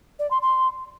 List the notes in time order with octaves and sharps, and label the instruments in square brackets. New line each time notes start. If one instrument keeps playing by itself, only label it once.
[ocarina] D5
C6
C6